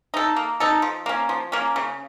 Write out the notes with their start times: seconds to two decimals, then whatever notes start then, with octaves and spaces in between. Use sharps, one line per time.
0.14 D#4 A4
0.36 A#3
0.60 D#4 A4
0.82 F3
1.06 A#3 C#4
1.29 F3
1.52 A#3 C#4
1.76 C#3